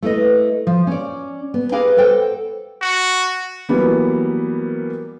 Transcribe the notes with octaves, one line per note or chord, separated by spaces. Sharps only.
A3 E4 B4 D#5
F3
C#4 D5
B3
G4 G#4 A#4 B4 F5 G5
A4 C5 F#5 G5
F#4
E3 F#3 G3 A#3 B3